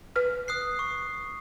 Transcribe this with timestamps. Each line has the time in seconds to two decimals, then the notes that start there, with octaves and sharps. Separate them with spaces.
0.16 B4 F6
0.48 D#6 F#6 C7
0.79 C#6